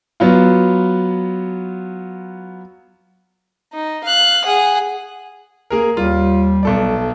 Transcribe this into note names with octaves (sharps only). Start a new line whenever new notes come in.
F#3 B3 F4
D#4
F5 F#6
G#4 F#5
A#3 G#4 A#4
D#2 G3 F4
B1 A4 D5